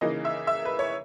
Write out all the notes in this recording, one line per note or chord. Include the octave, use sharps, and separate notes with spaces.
C#3 E3 A#3 D#4 D#5
E5
E5
B4
C#5